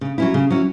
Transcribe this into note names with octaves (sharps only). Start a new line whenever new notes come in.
C#3
F#3 C#4 E4
C#3
F#3 C#4 E4